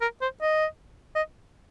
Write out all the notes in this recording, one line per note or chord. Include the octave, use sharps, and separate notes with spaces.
A#4
C5
D#5
D#5